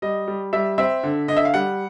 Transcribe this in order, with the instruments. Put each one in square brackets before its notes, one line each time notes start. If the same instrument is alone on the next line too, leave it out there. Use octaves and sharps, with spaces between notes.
[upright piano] G3 D#5
G3
G3 E5
C4 E5
D3
D3 D#5
E5
F5
G3 F#5